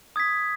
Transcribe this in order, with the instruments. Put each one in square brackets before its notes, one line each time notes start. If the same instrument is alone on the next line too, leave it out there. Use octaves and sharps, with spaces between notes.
[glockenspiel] D#6 G#6 B6